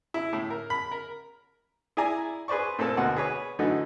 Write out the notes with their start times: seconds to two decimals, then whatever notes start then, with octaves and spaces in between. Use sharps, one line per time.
0.14 E4
0.33 A2
0.50 A#4
0.70 B5
0.91 A#4
1.97 E4 G#4 D5 G#5 A#5
2.48 G#4 B4 C5 D5 C#6
2.79 A#2 A3 A#3 C4 A4 A5
2.97 D2 B2 F#4 F#5
3.17 G#4 B4 C#5
3.59 D3 E3 F#3 A3 D#4